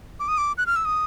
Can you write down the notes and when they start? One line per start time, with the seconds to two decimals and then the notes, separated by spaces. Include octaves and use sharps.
0.20 D6
0.28 D#6
0.38 D6
0.58 F#6
0.67 F6
0.76 E6
0.85 D#6